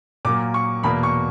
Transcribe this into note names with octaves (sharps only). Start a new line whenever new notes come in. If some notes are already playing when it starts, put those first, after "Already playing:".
A#2 F#3 A#3 D6
C#6
E2 B2 A#3 B5
C#6